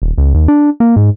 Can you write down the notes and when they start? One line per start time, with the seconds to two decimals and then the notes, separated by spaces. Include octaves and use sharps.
0.02 D#1
0.18 C#2
0.34 D#2
0.48 D4
0.80 A#3
0.96 G#2